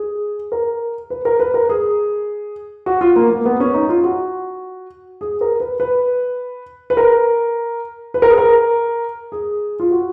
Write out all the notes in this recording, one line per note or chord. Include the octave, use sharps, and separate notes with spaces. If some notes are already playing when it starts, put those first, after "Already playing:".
Already playing: G#4
A#4
B4
A#4
B4
A#4
G#4
F#4
F4
A#3
A#3
B3
C#4
D#4
F4
F#4
G#4
A#4
B4
B4
B4
A#4
B4
A#4
G#4
A#4
G#4
F4
F#4